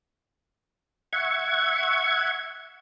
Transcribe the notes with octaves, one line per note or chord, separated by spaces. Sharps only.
E5 F#5 C#6 G#6